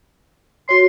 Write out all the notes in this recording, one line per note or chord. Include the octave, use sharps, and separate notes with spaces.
F#4 C#5 C6